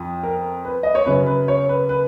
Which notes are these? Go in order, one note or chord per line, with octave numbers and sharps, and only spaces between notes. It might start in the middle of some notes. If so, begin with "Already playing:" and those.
Already playing: F2 F3
A#4
B4
D#5
C#5
F#2 C#3 F#3 B4
B4
C#5
B4
B4